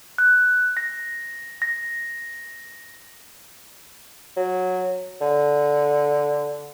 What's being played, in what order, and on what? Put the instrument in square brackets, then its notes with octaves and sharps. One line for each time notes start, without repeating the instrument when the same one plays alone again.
[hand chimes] F#6
A#6
A#6
[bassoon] F#3
D3